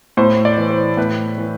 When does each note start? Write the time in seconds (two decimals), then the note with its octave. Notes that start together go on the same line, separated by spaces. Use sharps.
0.17 A2 C5
0.45 D5
0.58 E3
0.71 C5
0.97 A2 B4
1.38 E3